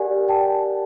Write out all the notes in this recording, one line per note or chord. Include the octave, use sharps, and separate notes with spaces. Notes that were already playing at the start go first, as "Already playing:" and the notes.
Already playing: G4 A#4 D5 F#5 G#5
G5 A5